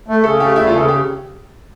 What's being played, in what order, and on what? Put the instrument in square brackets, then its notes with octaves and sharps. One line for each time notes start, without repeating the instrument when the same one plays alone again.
[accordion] A3
[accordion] C#3 [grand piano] A4
[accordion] A3 [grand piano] G4
[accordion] E2 [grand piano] E4
[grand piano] F4
[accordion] C#3
[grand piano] A4
G4